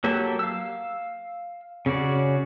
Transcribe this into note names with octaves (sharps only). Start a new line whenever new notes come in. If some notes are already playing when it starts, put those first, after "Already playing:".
F#3 A#3 G4 A4
F5 E6
C#3 C#4 F#4 D5